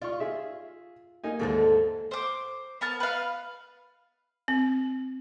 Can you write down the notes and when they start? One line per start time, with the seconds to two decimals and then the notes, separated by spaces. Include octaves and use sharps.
0.02 F4 D5 C#6
0.20 G#4 E5
1.24 A#3 D#4 G#5
1.39 D#2 G#2 D3 A3 C4
2.11 C5 D6
2.81 B3 A#4 A5
3.00 B4 F5
4.48 C4